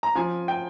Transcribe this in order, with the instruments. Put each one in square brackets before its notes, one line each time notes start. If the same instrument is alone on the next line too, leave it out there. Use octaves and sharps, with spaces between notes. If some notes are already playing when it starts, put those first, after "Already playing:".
[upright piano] A#5
F3 G#5
G5